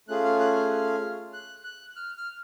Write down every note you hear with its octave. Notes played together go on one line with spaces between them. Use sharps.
A3 C#4 F4 G#4 F#6
F6
F#6
F6
F#6
F#6
F6
F6